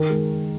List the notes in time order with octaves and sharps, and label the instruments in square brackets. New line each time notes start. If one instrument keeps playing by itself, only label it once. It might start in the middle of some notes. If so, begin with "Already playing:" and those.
Already playing: [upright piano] D#3 A#4
G#3